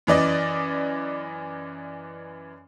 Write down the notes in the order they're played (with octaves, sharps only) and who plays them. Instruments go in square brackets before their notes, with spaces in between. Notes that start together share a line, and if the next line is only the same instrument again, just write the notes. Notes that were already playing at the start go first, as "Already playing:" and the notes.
[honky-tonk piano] F#2 E3 D5 D#5